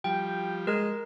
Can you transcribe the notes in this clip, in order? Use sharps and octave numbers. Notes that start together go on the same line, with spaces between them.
F3 G3 G5
G#3 A#4